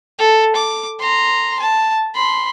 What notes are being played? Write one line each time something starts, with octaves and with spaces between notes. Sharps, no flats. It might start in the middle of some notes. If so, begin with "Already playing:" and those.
A4
D6
A#5 C6
A5
B5 C6